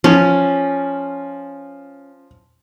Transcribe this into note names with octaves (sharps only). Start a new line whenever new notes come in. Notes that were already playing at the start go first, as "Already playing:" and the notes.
F3 C#4